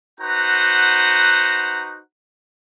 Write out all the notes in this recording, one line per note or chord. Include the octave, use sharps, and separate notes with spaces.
D#4 F#4 B4 C5 F#5 A#5